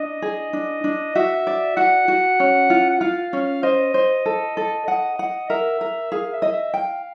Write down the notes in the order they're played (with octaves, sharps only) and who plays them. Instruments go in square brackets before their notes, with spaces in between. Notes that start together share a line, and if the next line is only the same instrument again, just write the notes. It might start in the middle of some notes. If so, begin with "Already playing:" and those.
Already playing: [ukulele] D4 [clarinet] D#5
[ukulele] G#4
D4
D4
[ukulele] F#4 [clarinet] E5
[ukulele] D5
[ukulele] F#4 [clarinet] F#5
[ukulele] F#4
C#4
F4
[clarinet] F#5
[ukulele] F4 [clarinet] F5
[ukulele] C#4
[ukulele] C5 [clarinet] D#5
[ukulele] C5
A4
A4
[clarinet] D#5 [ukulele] F#5
[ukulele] F#5
[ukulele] A#4 [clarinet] E5
[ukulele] A#4
[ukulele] G#4 [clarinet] F5
[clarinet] E5
[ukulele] D#5
[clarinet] E5
[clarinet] F5 [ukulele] G5